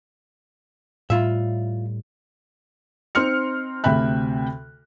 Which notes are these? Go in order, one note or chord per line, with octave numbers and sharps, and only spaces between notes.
A2 G3 F4 E5
C4 D#4 C6 F6 C#7
D2 C3 E5 G5 B5 F#6